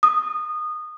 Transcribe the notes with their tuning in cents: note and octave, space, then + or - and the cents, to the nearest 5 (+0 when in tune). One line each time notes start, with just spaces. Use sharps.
D#6 -20